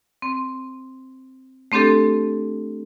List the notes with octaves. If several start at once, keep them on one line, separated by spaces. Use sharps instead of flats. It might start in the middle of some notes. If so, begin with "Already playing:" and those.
C4
A3 C4 D4 G4 A4